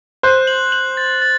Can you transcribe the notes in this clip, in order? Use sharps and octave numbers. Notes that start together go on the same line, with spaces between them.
C5 F#6
F#7
F#7
A6
A6